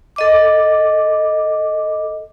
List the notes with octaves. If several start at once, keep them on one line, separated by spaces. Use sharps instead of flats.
A4 D#5 D6